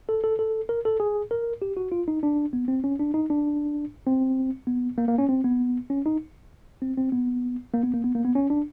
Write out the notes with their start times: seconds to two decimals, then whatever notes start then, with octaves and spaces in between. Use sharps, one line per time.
0.09 A4
0.24 A4
0.39 A4
0.69 A#4
0.85 A4
1.00 G#4
1.31 A#4
1.62 G4
1.77 F#4
1.92 F4
2.08 D#4
2.23 D4
2.53 B3
2.68 C4
2.84 C#4
3.00 D4
3.14 D#4
3.30 D4
4.07 C4
4.67 B3
4.98 A#3
5.08 A#3
5.18 C#4
5.29 C4
5.44 B3
5.90 C#4
6.06 D#4
6.82 C4
6.97 C4
7.12 B3
7.74 A#3
7.84 B3
7.94 A#3
8.04 B3
8.15 A#3
8.25 B3
8.35 C#4
8.50 D4